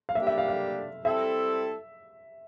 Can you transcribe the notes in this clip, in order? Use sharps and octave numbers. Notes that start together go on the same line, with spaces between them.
F5
G3 A#3 D4 G4 E5
E5
F5
F5
G3 C4 E4 A4 E5